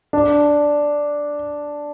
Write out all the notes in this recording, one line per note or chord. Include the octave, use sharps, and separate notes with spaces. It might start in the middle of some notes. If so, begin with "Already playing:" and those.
D4